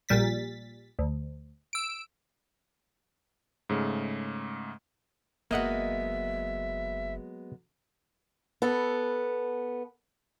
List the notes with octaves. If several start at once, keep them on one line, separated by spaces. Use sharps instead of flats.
A#1 A#2 G3 A6 B6
D2
E6 D7
G#2 C#3 A3
F#1 F#3 G#3 A#3 B3 D#5 E5 F#5
B3 A4